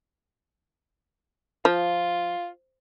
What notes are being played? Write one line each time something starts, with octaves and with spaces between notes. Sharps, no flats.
F3 F4